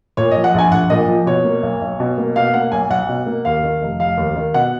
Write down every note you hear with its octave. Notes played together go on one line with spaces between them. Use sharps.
A#2 C#5
F3 D#5
F#5
A#1 G#5
A#1 F#5
A#2 D#5
F3
B2 C#5
A#3
B1
B1
B2
A#3
B2 F5
A#3 F#5
B1 G#5
B1 F#5
B2
A#3
D#2 F5
D#3
F1
F1 F5
D#2
D#3
B2 F#5